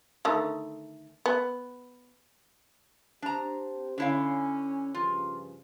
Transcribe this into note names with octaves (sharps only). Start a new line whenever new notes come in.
D3 D#3 A3
B3
C4 D4 G4 C5 A#5
D3 C#4 E4 F5
G2 C#3 F3 F4